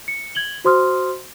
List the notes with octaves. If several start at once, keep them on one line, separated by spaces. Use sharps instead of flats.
C#7
G#6 F#7 G7
F#4 C5 C6 D#6 F6